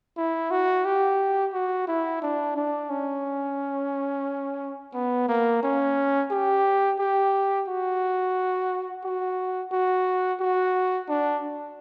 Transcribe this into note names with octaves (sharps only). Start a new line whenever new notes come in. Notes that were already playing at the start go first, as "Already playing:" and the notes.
E4
F#4
G4
F#4
E4
D4
D4
C#4
B3
A#3
C#4
G4
G4
F#4
F#4
F#4
F#4
D4